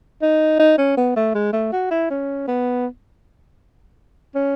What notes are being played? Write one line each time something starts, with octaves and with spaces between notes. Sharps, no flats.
D#4
D#4
C#4
B3
A3
G#3
A3
F#4
E4
C#4
B3
C#4